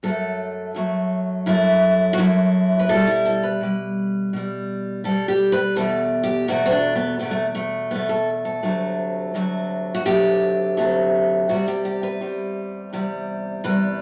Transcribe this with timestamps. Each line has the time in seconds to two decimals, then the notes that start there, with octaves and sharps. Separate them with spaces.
0.03 F#2 F#3 A3 A4
0.75 F#2 F#3 A3
1.46 F#2 F#3 A3 E4
2.13 F#4
2.18 F#2 F#3 A3 E4
2.79 B4
2.89 B2 G3 A4
3.07 E4
3.26 A4
3.43 B4
3.61 B2 G3
4.33 B2 G3
5.04 B2 G3 A4
5.28 G4
5.52 B4
5.76 E2 B2 A3 A4
6.24 G4
6.48 E2 B2 A3 F#4
6.66 C4
6.71 D4
6.95 B3
7.19 E2 B2 A3 B3
7.31 A3
7.55 A3
7.91 E2 B2 A3 B3
8.09 A4
8.45 A4
8.63 D2 C3 F#3 A3
9.34 D2 C3 F#3 A3
9.95 F#4
10.06 D2 C3 F#3 A3 G4
10.77 D2 C3 F#3 A3
11.49 E2 C3 G3 F#4
11.68 G4
11.85 G4
12.03 B4
12.21 E2 C3 G3
12.93 E2 C3 G3
13.64 E2 C3 G3 B4